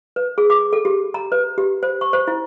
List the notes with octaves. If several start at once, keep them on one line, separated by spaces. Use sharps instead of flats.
B4
G#4
D6
A4
G4
A#5
B4
G4
C5
C#6
C5
E4